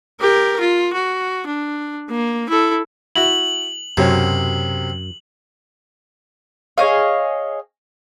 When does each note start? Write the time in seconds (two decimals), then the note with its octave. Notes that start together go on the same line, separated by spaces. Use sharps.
0.21 G4 A#4
0.60 F4
0.93 F#4
1.46 D4
2.10 A#3
2.49 E4 A4
3.16 E4 F#4 F#7
3.97 B1 F#2 C3 F#3 C#5
6.78 G#4 C#5 D#5 F5